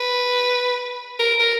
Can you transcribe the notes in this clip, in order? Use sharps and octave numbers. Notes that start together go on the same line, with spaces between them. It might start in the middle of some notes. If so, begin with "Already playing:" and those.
Already playing: B4
A#4
A#4